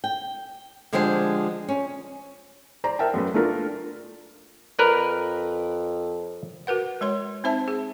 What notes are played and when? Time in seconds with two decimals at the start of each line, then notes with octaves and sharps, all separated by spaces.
0.04 G5
0.92 D3 F3 G#3 D4 G4 C5
1.68 C#4
2.84 C5 D5 A#5
2.99 A#4 E5 F#5 G5 A5
3.14 F#2 A3 B4
3.34 A3 D4 F4 A#4
4.79 F2 A#4 B4 D5
6.67 F#4 A#4 B4 F#5
7.01 G#3 C#5 C6
7.44 C4 D#4 C5 E5 A5
7.68 G#4